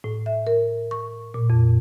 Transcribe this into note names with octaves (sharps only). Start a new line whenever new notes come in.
A2
E5
A#4
C#6
A#2
F2